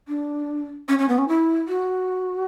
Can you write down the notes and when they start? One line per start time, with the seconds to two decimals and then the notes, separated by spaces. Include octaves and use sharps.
0.08 D4
0.89 C#4
0.99 C#4
1.08 B3
1.18 C#4
1.28 E4
1.69 F#4